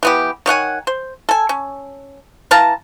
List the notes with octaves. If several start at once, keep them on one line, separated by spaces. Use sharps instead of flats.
E3 B3 G4
D#3 C#5 F#5 G#5
C5
A4 G#5
C#4
E3 F5 A5 A#5